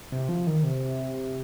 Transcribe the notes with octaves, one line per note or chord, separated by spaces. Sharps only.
C3
F3
D#3
C3